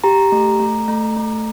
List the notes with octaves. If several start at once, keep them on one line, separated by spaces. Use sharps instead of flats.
G4 A#5
A3
A3
A3
A3